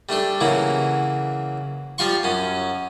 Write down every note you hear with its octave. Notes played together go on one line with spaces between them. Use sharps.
G3 A3 D4 A4
C#3 E3 F#3 A#3 E4
F3 G3 F4 F5 C6 C#6
F#2 C#4